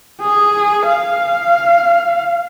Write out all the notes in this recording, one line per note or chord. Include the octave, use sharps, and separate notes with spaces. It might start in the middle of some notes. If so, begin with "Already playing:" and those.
G#4
F5